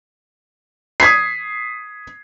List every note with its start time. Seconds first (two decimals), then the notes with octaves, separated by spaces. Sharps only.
1.00 D#6 G#6 B6 C7